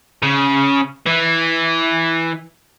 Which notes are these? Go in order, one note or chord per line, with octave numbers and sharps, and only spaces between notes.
C#3
E3